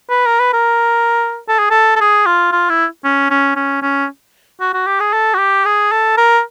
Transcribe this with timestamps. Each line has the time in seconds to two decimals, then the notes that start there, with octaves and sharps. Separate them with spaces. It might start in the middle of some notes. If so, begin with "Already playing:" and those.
0.09 B4
0.26 A#4
0.40 B4
0.53 A#4
1.48 A4
1.59 G#4
1.70 A4
1.96 A4
2.01 G#4
2.26 F4
2.52 F4
2.69 E4
3.04 C#4
3.30 C#4
3.56 C#4
3.82 C#4
4.61 F#4
4.73 F#4
4.87 G4
5.00 G#4
5.13 A4
5.34 F#4
5.38 G4
5.65 G#4
5.92 A4
6.17 A#4